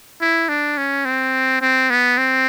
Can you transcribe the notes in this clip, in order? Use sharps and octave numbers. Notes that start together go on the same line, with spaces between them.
E4
D4
C#4
C4
C4
B3
C4